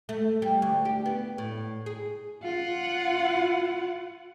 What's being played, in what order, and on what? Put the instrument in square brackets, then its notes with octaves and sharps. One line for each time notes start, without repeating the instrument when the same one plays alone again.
[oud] A3
G3
D2
G4
B3
A2
G#4
[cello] F4 F#5